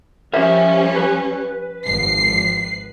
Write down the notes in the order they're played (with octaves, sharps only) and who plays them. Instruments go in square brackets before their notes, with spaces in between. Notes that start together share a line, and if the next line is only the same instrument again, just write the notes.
[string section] F3 G3 C#4 [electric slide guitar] A#4 C5 E5
[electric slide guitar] B4
[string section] G#1 F3 C7